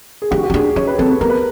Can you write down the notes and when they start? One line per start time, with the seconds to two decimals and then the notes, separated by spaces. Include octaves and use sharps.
0.22 G#4
0.31 D4 G4
0.38 F#4
0.43 G4
0.50 C#4
0.54 D4 G#4
0.76 C#4 C#5
0.87 B4
0.98 C4 A4
1.10 B4
1.20 B3 A#4
1.30 B4